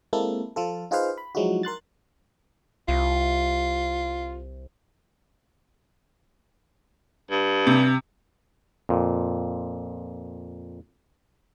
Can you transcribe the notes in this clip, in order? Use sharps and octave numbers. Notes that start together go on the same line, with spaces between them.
G#3 A#3 C4 E4 A4
F3 F4 A4
D#4 F4 G#4 B4 C5 F5
B5
F3 F#3 G#3 D#4 E4 F#4
A#4 C6 F#6 A6
C2 F4
G2
C3
F2 A#2